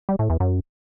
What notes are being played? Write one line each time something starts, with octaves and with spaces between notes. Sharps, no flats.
G3
A2
E2
F#2